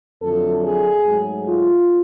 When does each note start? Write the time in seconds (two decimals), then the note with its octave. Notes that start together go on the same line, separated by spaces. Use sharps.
0.22 F2 D3 F#3 A3 A4
0.63 G#4
1.06 G#2 F#3 A3
1.47 F4